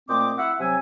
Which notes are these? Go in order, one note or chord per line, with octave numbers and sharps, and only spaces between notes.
A#2 A3 C4 C5 D#5 D6
E4 E5 F#5
C3 F#3 C4 E5 G#5